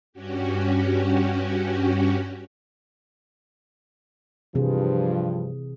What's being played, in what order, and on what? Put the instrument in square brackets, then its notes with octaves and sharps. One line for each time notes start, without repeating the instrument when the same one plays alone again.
[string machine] G2 C#4 F#4 G4
[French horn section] G2 F3 [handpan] C3 E3 G#4